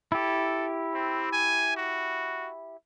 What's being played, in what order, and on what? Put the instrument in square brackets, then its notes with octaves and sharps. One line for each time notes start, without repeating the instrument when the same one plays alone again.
[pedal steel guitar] E4 G4 [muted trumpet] A4
[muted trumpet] C4
G#5
F#4